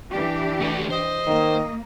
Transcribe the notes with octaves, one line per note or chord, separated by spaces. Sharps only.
E3 D4 G4
A3 F#4
C5 D#5
D#3 A#3